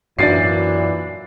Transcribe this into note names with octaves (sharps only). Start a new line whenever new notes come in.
F#2 A#2 E3 D4 F#4 A6 C7